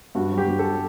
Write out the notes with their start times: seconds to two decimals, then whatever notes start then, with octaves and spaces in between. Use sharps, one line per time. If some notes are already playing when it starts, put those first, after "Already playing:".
0.15 G2 F#4
0.32 F#3
0.38 G4
0.48 G2
0.59 A4